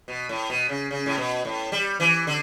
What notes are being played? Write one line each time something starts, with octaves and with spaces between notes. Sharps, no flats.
B2
A2
B2
C#3
C#3
A2
B2
A2
G3
E3
D3